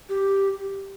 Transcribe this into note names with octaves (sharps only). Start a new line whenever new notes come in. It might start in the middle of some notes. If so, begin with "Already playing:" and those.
G4